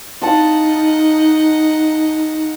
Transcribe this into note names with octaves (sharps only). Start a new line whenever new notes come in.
D#4 F4 D#5 F#5 A5